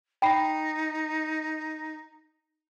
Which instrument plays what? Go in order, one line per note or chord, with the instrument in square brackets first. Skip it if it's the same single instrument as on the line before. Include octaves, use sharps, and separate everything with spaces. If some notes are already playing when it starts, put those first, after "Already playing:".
[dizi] D#4 [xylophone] G5 B5 C7